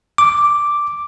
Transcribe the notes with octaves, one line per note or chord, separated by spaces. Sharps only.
D6